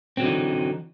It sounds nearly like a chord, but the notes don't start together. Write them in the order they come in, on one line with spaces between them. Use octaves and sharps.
C4 F#3 D3 D#4 E3